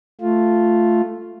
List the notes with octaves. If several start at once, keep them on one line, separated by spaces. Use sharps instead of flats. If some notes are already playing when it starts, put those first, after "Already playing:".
A3 F4